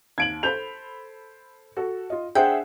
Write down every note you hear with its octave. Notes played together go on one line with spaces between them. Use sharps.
D#2 G#6 D7 F#7
A4 C5 B5 G6 F7
F#4 A4
F4 D#5
D4 G#4 C5 E5 F#5 G5